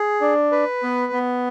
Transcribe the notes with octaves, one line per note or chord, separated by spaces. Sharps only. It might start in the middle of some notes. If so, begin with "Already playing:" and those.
Already playing: G#4
D4
B4
B3
B3